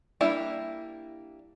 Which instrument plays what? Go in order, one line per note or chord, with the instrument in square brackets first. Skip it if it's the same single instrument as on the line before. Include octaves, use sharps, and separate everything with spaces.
[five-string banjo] G3 A#3 D4 E4